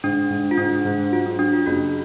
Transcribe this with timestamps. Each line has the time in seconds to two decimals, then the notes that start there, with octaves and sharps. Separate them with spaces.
0.04 G#2 D4
0.30 G#2
0.51 F4
0.58 G#2 D4
0.85 G#2
1.12 F#3 F4
1.26 D4
1.39 F#3 D4
1.53 F4
1.66 F#1 F#4